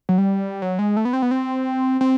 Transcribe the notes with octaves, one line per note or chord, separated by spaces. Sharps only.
F#3
G3
F#3
G#3
A3
B3
C4
B3
C4
C4